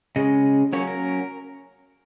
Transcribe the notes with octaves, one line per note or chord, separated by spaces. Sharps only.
C#3 G#3 C#4 D#5
F#3 A#3 C#4 C#5
A#4